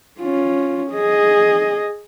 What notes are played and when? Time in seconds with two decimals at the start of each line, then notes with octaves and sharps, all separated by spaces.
0.20 C#4 F4
0.92 G#4 D#5